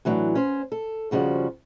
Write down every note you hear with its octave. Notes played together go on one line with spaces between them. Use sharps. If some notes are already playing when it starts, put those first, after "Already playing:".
A2 E3 F#3 D4
C#4 C5
A4
F2 C#3 F3 G3 F#4